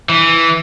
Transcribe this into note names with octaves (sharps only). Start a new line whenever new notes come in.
E3